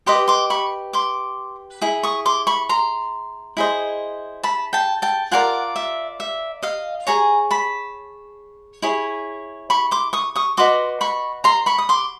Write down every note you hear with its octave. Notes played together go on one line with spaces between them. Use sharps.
G4 B4 D#5 C6 D6
C6 D6
B5 C#6
C6 D6
E4 G#4
C#6 D#6
C6 D6
B5 C#6
A#5 C6
E4 G#4 C5 D#5
A5 B5
G5 A5
G5 A5
F4 A#4 D5 F#5 G#5
E5
E5
D#5 F5
G#4 C#5 G#5 A#5
A5 B5
E4 G#4 C#5
B5 C#6
C6 D6
C#6 D#6
C#6 D#6
F#4 B4 D#5 C6 D6
B5 C#6
A#5 C6
B5 C#6
D#6
C6 D6